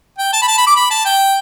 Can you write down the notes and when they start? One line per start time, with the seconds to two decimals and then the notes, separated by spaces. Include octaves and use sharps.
0.18 G5
0.33 A5
0.42 B5
0.48 A5
0.57 B5
0.67 D6
0.76 B5
0.91 A5
1.05 G5